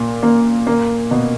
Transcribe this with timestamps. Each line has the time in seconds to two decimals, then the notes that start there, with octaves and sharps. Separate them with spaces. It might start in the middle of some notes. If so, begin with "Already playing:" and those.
Already playing: A#2
0.23 A#3
0.67 A#3
1.11 B2